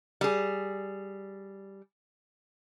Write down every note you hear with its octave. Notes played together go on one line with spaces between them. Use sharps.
G3 G#4